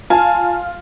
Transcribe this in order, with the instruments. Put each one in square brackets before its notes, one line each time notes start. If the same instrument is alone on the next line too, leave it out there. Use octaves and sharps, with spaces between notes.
[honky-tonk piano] F4 [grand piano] G#5 A5